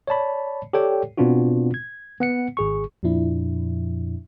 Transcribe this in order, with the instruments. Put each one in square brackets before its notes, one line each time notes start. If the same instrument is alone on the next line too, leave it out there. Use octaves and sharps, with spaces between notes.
[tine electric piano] C#5 D5 A5 B5
G4 A4 C#5 D5 G5
B2 B3 C4 D4 F4 F#4
G#6
B3 F#5 C#7
G#1 G#4 C#6
[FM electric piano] F2 A#2 F3 D4 E4